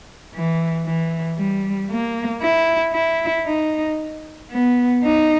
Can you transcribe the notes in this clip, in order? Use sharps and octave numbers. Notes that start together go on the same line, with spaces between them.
E3
E3
G3
A#3
E4
E4
D#4
B3
D#4